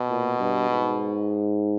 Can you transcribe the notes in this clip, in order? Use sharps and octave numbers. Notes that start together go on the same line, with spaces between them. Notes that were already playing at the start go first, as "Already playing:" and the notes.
Already playing: B2
A#2
G2
G#2